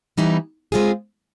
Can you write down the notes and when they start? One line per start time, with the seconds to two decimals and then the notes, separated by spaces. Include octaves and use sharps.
0.17 E3 G3 B3 D#4
0.72 G#3 C4 F4 G#4